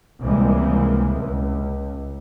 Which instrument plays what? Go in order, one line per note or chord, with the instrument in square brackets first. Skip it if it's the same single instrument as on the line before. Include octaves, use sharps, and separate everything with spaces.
[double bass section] C#2 C3 E3 G3 G#3 A#3
C#2